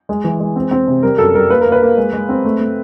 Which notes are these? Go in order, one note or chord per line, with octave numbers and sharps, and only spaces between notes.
G#3
E3
G#3
C4
C4
C3
G3 A#4
F#2 A4
G3 A#4
A#3 B4
A#3 A#4
B4
A#3
G#3
G#3
C4
A3
A3